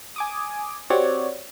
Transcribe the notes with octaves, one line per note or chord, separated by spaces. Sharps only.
G#5 D6 D#6
C4 F#4 G4 C#5 D5